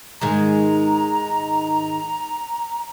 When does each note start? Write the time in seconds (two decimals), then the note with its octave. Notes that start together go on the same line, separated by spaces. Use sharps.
0.21 G#2 D#3 G#3 A#5